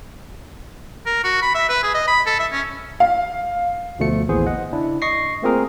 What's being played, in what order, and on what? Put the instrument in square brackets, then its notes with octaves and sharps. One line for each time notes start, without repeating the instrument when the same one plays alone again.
[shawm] A#4
F#4
B5
E5
B4
G#4
D#5
B5
A4
E5
C#4
[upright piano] F5
[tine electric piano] D2 B2 F3 A3 C#7
A1 D#2 E3 B3 G#4 C5
D#5 F#5
C#3 D4 E4
D#5 C#6 A#6 C7
A3 A#3 C4 F4 G#4 A#4